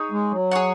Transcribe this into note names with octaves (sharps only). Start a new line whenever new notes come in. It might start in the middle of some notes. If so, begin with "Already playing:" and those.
Already playing: D#4 G#4 C#5
G#3
F#3
G#4 C#5 F#5